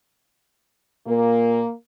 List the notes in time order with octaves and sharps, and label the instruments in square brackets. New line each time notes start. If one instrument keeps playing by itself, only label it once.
[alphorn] A#2 [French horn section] A#3